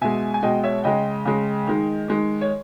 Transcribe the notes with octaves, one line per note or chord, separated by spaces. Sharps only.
B2 G#3 E5 G#5
G#5
B2 G#3 D#5 G5
C#5 E5
C#3 G#3 D#5 G5
C#3 G#3
D#3 G#3
D#3 G#3
C#5